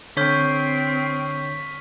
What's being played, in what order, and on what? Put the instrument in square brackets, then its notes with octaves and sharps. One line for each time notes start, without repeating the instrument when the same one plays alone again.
[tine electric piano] D3 C#5 G6 [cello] C4 [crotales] C#6 F6 B6